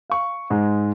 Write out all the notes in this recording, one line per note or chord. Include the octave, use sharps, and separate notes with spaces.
F5 C#6
G#2 G#3